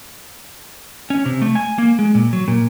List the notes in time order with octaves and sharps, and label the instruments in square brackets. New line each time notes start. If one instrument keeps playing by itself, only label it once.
[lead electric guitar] C#4
C3
A3
G#5
A#3
G#3
A#2
F#3
A#2